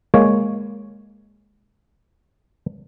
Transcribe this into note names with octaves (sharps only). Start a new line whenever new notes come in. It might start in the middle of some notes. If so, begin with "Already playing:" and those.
G#3 A#3 C#5